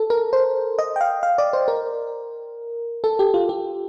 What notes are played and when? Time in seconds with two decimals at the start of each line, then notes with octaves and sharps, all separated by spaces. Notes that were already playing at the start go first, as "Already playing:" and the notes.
Already playing: A4
0.10 A#4
0.33 C5
0.79 D#5
0.96 G5
1.01 F5
1.23 F5
1.38 D5
1.53 C5
1.68 A#4
3.04 A4
3.19 G4
3.34 F4
3.49 G4